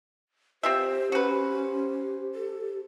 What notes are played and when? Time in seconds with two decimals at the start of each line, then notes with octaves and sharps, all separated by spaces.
0.63 C4 F4 G4 C5 E5
1.12 C#4 F#4 B4 C5
2.35 A4